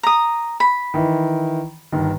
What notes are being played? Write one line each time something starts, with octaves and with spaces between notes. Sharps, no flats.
A#5 D#6
B5
D#3 E3 E4
G1 D#3